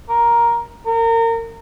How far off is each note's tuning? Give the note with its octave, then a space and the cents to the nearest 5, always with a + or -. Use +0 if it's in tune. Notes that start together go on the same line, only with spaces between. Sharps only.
A#4 +10
A#4 -30